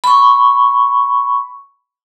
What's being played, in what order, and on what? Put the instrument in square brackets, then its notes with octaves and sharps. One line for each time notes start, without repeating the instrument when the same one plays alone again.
[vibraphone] B5 C#6